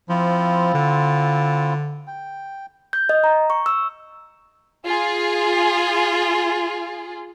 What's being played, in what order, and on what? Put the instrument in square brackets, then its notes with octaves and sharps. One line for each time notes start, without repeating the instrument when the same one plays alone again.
[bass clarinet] F3 [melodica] C4 E4 F4
[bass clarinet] D3
[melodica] G5
[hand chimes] G6
D#5
A#5
C#6
E6
[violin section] F4 G#4